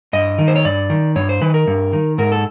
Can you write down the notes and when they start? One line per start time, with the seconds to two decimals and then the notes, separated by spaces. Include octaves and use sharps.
0.13 G2 D#5
0.38 D#3
0.48 C5
0.56 C#5
0.65 G2 D5
0.90 D#3
1.16 G2 C#5
1.29 C5
1.42 D#3 B4
1.54 A#4
1.67 G2
1.93 D#3
2.18 G#2 A#4
2.32 A4